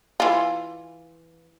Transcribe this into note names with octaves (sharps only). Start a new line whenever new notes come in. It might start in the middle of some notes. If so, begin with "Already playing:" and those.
E3 F4